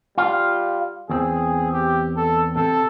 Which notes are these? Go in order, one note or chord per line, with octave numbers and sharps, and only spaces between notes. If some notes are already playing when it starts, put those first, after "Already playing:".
G3 F4
E2 C4 G#4
G4
A4
C3 A4